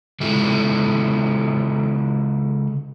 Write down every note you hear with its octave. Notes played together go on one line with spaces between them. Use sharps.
C#3 G#3 E4 F4 A4